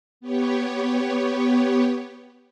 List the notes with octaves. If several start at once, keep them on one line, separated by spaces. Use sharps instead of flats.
B3 G4 C#5